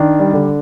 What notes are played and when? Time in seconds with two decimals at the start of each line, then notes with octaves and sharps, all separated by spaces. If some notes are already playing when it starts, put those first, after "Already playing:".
Already playing: D#3 D4
0.19 G3
0.33 D3